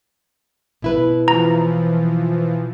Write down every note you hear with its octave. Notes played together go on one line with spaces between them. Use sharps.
B2 E4 B4
E3 F3 A#5